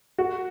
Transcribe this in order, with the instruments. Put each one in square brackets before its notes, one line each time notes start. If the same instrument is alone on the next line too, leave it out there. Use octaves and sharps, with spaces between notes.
[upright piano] F#4